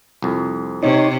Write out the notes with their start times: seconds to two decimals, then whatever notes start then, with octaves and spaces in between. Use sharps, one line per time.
0.22 C2 F2
0.83 C3 D#4 C#5